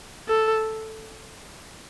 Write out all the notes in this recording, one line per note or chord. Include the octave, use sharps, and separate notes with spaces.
A4